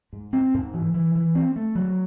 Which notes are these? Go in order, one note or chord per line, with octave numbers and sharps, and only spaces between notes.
G#2
C4
G#2
E3
E3
E3
C4
A3
F#3